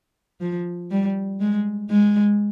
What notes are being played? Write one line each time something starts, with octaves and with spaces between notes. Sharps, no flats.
F3
G3
G#3
G#3